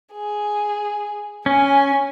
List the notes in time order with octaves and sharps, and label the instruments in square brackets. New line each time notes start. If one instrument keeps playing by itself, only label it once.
[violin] G#4
[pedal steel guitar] C#4 [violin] G#5